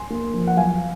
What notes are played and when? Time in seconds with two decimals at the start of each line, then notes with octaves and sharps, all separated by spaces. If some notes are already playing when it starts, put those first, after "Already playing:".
Already playing: G#5 C6
0.10 A#3
0.34 F3
0.47 F#5
0.57 F#3 F5 G#5